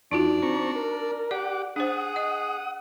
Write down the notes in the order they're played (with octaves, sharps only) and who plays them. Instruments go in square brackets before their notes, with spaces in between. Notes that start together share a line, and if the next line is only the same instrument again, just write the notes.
[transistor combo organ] E2 [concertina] D4 D5 [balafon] D#4 F4 F#4
[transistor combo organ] C4 A#5 C#6
A#4
[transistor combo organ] G4 F#5 D6 [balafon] D5
[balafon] D4 C5 [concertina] G#4 [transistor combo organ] F#5 D#6
[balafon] D#5